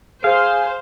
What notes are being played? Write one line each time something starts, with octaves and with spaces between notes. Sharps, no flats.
G#4 C5 F5